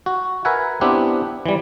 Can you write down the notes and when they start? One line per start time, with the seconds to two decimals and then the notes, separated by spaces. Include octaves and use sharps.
0.06 F#4
0.45 A#4 B4 E5 F#5 G#5
0.81 B3 C4 D4 E4 G4 B4
1.46 E3 G3